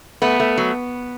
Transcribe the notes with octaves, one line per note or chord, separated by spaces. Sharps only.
A3 B3
A3
F#3